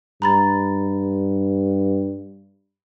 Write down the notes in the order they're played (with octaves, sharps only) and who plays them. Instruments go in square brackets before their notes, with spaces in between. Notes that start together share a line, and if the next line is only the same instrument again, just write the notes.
[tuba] G2 [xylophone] A#5 B5 A6